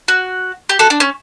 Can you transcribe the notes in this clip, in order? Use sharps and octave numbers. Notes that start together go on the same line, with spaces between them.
F#4
G4
F#4 A4
D4
C#4